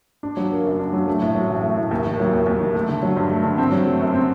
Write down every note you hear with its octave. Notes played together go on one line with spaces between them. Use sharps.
D4
F#3
A#3
F#2
D4
F#3
A3
A2
F#3
A1
A3
A2
D#2
D#3
F#3
D#2
D#2
D#3
A3
D3
F#3
G2
A3
D3
C4
F#3
A3
F#2
C4